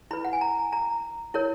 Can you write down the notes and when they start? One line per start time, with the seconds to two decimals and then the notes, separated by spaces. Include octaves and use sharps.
0.11 E4 B4 B5
0.25 F#5
0.33 G#5
0.41 A#5
0.72 A#5
1.34 E4 A#4 C#5